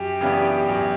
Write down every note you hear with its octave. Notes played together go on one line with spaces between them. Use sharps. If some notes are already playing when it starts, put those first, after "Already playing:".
Already playing: F#2 G4
C#3 E3 B3 D4
F#2